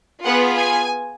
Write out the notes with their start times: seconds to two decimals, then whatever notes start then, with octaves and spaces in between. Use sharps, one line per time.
0.25 B3 F4 G#4 F#5
0.57 G#5